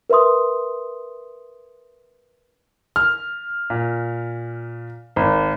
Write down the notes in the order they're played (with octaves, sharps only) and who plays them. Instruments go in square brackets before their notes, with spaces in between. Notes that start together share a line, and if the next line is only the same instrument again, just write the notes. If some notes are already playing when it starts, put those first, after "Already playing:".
[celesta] A#4 B4 E5 C6 D#6
[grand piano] F6
A#2
G#1